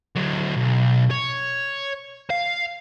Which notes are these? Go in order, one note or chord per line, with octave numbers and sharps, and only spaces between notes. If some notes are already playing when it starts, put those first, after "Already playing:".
D3 F#3
B1
C#5
F5